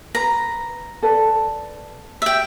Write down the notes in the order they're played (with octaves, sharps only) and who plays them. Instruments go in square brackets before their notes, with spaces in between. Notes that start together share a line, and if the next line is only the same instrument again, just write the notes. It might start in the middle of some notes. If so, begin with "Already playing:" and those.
[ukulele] B4 [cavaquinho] A#5
[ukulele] A4 B4 D5
[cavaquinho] E5 G5